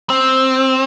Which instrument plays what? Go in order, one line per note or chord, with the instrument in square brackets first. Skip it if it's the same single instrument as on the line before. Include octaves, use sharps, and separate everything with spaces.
[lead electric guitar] C4